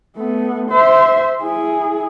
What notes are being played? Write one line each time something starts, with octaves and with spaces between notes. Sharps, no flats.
A3 B3
C5 E5
E4 G#4